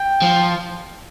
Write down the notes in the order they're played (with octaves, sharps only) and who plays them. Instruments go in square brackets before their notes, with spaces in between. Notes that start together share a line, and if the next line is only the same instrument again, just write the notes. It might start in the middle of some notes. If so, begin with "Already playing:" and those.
Already playing: [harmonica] G5
[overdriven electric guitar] F3